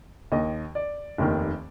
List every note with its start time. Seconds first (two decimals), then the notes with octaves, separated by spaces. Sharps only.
0.32 D#2 D#3 D#5
0.75 D5
1.18 F1 D#2 D#3